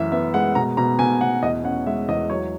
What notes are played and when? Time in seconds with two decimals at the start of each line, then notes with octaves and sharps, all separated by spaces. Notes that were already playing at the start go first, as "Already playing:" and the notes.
Already playing: F#2 E3 E5
0.12 B3 E5
0.34 G#3 F#5
0.55 B2 A#5
0.77 B2 A#5
0.99 B2 G#5
1.21 B2 F#5
1.43 E2 D#5
1.64 C#4 F#5
1.87 G#3 E5
2.08 E2 D#5
2.30 F#3 C#5